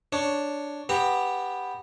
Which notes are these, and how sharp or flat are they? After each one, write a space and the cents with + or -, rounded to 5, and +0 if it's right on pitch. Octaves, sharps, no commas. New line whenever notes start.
D4 +0 C#5 +5
B3 +0 G4 +10 A#5 -15